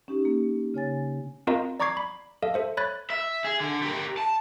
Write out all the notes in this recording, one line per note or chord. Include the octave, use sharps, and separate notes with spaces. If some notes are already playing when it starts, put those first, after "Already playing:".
C#4 D#4 G4
A#3
C#3 C#5 G#5 A6
C4 F4 A#4 D#5 F5 A#5
D5 A#5 C#6 D6 G#6 C7
B5
A4 D#5 F5
A4 C5 E5
C#5 B5 F#6 A6
E5
G#4
D3
G4 A#4
A5